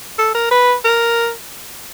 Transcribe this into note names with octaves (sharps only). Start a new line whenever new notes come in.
A4
A#4
B4
A#4